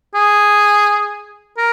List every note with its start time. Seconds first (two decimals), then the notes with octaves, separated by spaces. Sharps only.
0.14 G#4
1.57 A#4